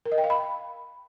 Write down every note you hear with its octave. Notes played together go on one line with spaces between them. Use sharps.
A#4
D#5
G5
F5
B5